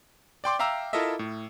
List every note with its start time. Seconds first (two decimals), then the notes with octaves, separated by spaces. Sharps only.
0.44 D5 G5 C6 D6
0.59 E5 F5 G5 A#5 E6
0.93 E4 F4 A4 A#4 D#5 E5
1.19 A2